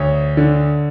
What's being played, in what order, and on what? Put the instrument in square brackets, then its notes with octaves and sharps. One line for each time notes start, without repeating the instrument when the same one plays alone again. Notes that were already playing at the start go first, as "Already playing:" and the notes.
Already playing: [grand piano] D2 C#5
D3